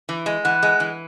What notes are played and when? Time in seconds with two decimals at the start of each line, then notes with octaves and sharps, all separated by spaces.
0.09 E3
0.26 G#3
0.45 E3 F#5
0.62 G#3
0.80 E3